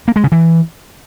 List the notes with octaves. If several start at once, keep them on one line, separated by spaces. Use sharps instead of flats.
A#3
G#3
C#3
E3